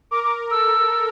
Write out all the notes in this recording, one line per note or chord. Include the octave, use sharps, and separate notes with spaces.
A#4 D6
D6
A4 E6